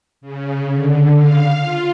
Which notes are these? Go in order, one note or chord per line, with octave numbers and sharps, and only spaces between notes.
C#3
D3
F5
F4